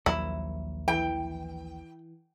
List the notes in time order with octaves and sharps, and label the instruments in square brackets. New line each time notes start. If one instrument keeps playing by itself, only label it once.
[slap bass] A#1 D#2 F#3 [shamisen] E4
[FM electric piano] E3 [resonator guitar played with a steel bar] G5